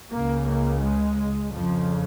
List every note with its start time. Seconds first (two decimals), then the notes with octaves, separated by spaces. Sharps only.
0.13 C#2 C#3 A#3
0.48 A#3
0.84 G#3
1.55 F2 C#3 F3